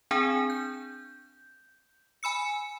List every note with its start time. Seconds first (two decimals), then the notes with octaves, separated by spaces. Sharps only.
0.11 C4 D4 G#4 G#5
0.50 G6
2.23 G#5 B5 E6 C#7